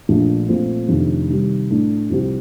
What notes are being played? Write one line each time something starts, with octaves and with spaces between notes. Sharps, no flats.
A#1 A#2 A3 D4
A#2 F3 A3 C4 F4
F2 C3 D#3 A3 D4
C3 D#3 G3
A2 A3 D4
C2 C3 F3 C4 G4